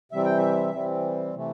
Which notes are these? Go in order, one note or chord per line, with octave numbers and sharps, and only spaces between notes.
C3 E3 G3 C4 E5
G5
E5
C3 E3 G3 C4
C3 E3 A3